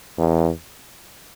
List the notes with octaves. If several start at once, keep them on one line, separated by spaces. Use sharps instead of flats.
E2